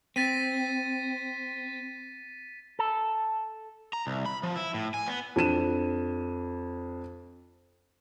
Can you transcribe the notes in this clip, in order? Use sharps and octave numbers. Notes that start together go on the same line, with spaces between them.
C4 A6 B6 D#7
A4
A#5
C2
B5
F3
E4
A2
G#5
B3
F2 D4 D#7 E7